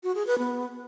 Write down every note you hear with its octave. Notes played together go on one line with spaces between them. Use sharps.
F#4
G#4
B4
B3